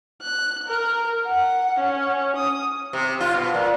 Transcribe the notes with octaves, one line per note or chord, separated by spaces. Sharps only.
F#6
A#4
F#5
C#4
D#6
C3
F4
B2
A#2